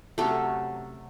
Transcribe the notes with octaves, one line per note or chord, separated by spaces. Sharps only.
C3 F#3 A3 C#4 A4